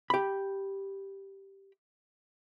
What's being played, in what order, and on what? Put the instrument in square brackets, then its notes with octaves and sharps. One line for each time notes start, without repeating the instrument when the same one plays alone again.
[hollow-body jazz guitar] G4 B5